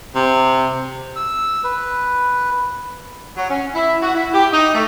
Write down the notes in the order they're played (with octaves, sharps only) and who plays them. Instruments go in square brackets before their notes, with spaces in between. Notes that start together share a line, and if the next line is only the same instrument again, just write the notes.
[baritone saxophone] C3
[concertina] E6
B4
[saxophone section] F#3
C#4
E4
F#4
E4
G4
D#4
A3